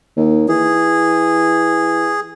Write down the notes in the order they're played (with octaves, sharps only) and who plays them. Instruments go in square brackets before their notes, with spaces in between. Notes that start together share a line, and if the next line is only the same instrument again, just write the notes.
[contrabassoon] D#2
[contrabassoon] E3 [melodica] G#4